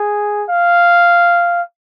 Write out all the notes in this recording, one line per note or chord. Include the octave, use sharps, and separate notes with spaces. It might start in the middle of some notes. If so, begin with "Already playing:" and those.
Already playing: G#4
F5